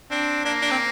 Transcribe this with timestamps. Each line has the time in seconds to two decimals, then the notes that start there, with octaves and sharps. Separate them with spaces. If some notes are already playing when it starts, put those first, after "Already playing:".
0.11 C4 D4
0.45 A#3 D4
0.62 D4
0.71 C4